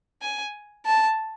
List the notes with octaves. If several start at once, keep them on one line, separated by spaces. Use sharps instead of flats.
G#5
A5